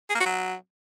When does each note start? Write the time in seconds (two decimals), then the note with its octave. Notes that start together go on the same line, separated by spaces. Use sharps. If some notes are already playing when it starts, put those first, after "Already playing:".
0.10 G#4
0.15 A#3
0.20 F#4
0.26 F#3